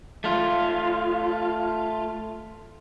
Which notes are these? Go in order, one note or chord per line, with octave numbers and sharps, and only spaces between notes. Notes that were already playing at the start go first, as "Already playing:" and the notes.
A3 F4